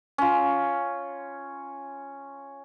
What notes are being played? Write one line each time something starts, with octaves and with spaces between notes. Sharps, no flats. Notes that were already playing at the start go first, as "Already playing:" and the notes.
C#4 F4